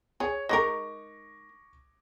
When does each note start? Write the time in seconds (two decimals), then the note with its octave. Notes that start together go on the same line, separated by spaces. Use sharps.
0.20 G#4 C#5
0.49 G#3 D#4 A#4 C#6 D6 A#6